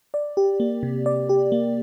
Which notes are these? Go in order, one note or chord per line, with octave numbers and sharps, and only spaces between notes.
D5
G4
A#3
C3
D5
G4
A#3